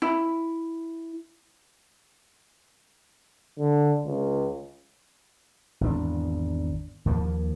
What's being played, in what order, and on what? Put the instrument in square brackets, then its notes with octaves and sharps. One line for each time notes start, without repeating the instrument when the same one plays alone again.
[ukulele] E4
[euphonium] D3
C#2
[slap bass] G#1 E2 D4
D#2 F3 A#3